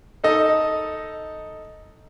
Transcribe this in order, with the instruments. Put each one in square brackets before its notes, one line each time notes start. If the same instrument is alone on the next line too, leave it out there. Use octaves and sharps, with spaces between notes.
[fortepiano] D#4 A4 D#5